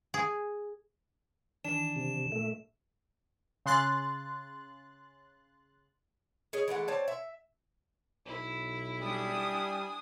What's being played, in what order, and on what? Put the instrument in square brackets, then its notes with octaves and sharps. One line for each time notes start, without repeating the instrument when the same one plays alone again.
[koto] G#4
[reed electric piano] D#3 E3 [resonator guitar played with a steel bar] D4 [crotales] E7
[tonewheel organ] C3
[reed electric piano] A#2 [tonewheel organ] A3
[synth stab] C#3 C6 F#6 A6
[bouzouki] G#4 C#5 D#5
E3 G#3 A3 F#5
C4 C#5 D5 A5
E5
[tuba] B1 [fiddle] E4
[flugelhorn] G3 [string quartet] D4 G#5 D#6